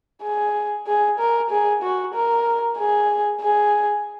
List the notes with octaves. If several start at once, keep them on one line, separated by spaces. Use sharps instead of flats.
G#4
G#4
A#4
G#4
F#4
A#4
G#4
G#4